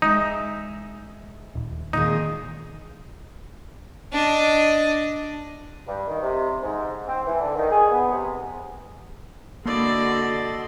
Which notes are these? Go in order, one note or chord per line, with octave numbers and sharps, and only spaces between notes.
G#3 D#4 E5
D#1
A#2 D#3 D#4 G#4
D4 D#5
G2
D#3
C3
G#2
C4
E3
D3
D#3
G#4
B3
C3
D3 A#3 E4 F#4 A4 D5 D#5 C6